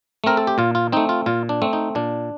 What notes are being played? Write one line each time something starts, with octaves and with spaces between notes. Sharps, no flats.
A3 C4 A#4
A4
G4
A#2 F4
F4
A3 C4 D#4
F4
A#2 F4
D4
A3 C4
D#4
A#2 D4